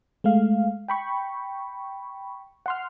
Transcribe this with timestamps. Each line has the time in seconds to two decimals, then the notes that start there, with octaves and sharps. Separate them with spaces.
0.24 G#3 A3 F5
0.88 G5 B5 C#6
2.66 F#5 C6 F6